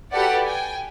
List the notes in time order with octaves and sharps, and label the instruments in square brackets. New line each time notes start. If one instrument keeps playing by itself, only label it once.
[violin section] F#4 G4 A4 B4 D5 F#5
G5 G#5